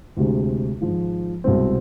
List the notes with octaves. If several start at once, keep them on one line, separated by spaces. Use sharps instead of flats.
D2 C3 G#3
G#1 G#2 F3 G#3
C2 B2 G#3 C4